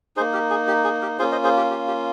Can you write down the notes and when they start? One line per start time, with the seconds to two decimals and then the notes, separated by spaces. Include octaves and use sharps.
0.16 D#4 G#4 C5
0.20 A#3
0.33 G4 A#4
0.50 G#4
0.68 G4
0.84 G#4
1.02 G4 A#4
1.19 A#3 C#4 F4 G#4 C5
1.32 C5 D#5
1.44 G#4 C5
1.57 G4 A#4
1.70 G4
1.87 G4